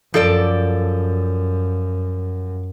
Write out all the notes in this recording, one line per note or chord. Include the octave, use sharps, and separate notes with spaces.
F#2 F3 A4 D5